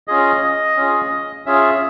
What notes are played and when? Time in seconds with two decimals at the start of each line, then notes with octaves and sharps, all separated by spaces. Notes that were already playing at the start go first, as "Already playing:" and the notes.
0.08 C#4 F4 G#4 D#5
0.77 C#4 F4 G#4
1.46 C#4 F4 G#4 E5